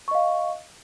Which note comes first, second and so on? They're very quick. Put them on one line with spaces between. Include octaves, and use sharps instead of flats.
C#6 D#5 F5